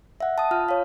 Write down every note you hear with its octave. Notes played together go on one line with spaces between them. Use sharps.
E5 F#5
A5 D#6
F4 F6
C#5 F5